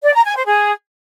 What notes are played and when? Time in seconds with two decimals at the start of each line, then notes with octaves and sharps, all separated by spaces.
0.03 D5
0.14 A#5
0.25 G#5
0.35 C5
0.46 G#4